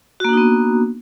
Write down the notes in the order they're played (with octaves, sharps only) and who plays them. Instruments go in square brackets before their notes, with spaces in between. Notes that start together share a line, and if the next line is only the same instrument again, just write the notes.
[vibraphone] F#4
A#3
D4
D#4
B3